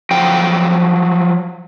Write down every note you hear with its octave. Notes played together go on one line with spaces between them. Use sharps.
F3 F#3 G5